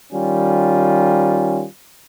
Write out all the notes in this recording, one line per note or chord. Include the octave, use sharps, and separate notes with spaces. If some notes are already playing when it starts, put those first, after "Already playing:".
D#3 G3 C#4 F4